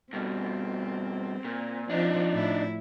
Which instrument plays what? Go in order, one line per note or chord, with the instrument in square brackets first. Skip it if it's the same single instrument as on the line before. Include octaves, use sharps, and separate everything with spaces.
[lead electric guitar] G2 B2 [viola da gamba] C4
[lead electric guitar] A#2
[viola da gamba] F3 C4 [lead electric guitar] D4 D#4
[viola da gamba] A2 E4